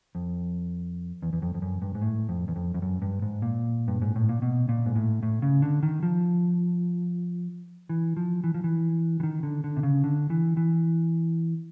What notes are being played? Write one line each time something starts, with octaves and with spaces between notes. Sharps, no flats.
F2
E2
E2
F2
F2
F#2
G2
G#2
A2
F2
E2
F2
F2
F#2
G2
G#2
A#2
G2
G#2
A2
A#2
B2
A#2
G#2
A2
A2
C#3
D3
D#3
F3
E3
F3
E3
F3
E3
E3
D#3
D3
D3
C3
C#3
D3
E3
E3